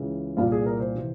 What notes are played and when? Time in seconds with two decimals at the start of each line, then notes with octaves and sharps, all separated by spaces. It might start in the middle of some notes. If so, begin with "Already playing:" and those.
Already playing: C#2 C#3 E3
0.37 C2 A#2 F4
0.52 G#4
0.66 A#4
0.80 C5
0.95 C3 E3